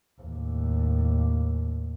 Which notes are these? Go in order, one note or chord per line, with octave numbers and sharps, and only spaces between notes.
D#2 A2